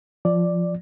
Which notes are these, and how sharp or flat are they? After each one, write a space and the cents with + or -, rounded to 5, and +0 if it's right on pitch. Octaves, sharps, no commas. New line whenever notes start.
F3 +0 D5 +0